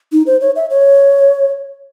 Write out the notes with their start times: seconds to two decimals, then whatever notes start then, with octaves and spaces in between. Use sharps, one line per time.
0.12 D#4
0.27 C5
0.41 C#5
0.56 E5
0.70 C#5